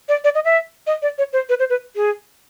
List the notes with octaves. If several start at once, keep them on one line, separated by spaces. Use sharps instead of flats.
D5
D5
D#5
E5
D#5
D5
C#5
C5
B4
C5
B4
G#4